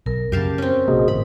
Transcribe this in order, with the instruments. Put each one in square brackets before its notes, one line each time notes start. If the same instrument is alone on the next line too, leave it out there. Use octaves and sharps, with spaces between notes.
[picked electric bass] B1 [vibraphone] A#4
[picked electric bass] F#2 C#3 [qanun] G4 F5 A5
[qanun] C4 C#4
[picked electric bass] A#1 C3 A#3 [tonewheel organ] F#4 G#4 D#5
[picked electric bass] G#1 A2 [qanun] B5